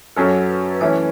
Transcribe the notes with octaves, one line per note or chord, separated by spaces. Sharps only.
F#2 F#3 C#4 A4
B4
B4
E3 A3 C#4 E4 C#5